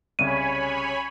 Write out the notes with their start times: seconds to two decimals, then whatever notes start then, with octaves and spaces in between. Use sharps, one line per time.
0.19 C2 C#3 C#5 G#5 B5 D#7